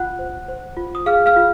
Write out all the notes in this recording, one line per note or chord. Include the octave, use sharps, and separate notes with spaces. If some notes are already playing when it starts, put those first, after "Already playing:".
Already playing: F4 F#5 F#6
C5
C5
F4
D#6
G#4 F5 F6
F5 F6
F4